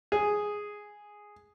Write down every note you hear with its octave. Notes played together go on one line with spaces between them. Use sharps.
G#4